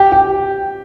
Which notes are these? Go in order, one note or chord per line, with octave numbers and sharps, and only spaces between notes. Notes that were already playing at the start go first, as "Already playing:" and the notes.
Already playing: G4
G4